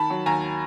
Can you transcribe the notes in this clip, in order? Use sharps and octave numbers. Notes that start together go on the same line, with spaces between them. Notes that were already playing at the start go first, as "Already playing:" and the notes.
Already playing: D#3 A5 B5
F#3
D#2 G#5 A#5